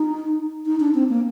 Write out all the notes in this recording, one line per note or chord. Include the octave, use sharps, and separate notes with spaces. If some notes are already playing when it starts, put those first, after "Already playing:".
Already playing: D#4
D#4
D4
C4
A#3